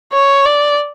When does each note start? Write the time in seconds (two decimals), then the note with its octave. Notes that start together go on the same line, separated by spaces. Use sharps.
0.12 C#5
0.46 D5